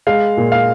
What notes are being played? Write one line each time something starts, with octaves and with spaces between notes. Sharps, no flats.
G#3 F5
A#2
F5